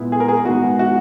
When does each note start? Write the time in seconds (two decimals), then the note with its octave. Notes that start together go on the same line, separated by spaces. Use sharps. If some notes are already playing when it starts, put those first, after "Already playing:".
Already playing: A#2 G#3 B3 E4
0.12 G#4
0.20 A#4
0.29 G#4
0.45 G#2 D#3 G#3 B3 F#4
0.79 F#4